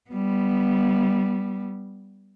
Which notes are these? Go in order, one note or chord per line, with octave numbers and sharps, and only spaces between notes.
G3 B3